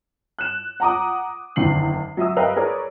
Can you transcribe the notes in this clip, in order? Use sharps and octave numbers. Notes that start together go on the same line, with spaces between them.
F#6 E7
F#5 A#5 D6 D#6
F#1 E2 D3 D#3 C7 F#7
F#3 E5 D#6 E6
G4 A#4 B4 D#5 F5 G5
G#4 A#4 B4 C#5 D5